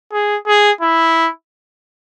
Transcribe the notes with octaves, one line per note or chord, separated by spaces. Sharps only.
G#4
G#4
E4